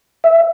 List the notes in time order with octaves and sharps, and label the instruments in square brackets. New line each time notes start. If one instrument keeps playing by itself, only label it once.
[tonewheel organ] E5